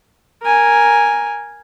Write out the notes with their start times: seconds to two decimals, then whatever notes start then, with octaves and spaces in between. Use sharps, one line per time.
0.42 A#4 G#5